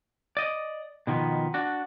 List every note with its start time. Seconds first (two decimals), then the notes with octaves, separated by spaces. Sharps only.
0.37 D5 D#5
1.07 B2 D#3 F3 B3
1.54 D4 F#4